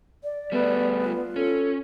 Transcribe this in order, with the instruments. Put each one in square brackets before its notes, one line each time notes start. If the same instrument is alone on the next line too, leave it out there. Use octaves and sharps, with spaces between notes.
[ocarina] D5
[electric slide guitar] G3 A3 [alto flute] B3
[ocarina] F4
[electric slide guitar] C#4 [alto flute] A4